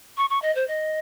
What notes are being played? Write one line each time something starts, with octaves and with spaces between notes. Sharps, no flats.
C#6
C#6
D#5
C5
D#5